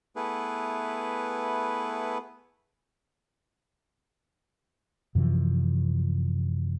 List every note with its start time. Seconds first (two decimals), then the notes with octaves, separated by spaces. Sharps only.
0.16 A3 B3 E4 G#4 B4
5.15 F#2 C3 E3 F3